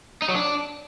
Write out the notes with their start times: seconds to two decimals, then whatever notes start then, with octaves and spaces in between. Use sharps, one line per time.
0.22 D#4
0.29 F#3
0.35 D4